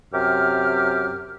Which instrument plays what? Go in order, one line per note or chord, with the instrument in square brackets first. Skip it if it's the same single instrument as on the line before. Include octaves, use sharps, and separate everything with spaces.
[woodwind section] F#2 C3 G4 F6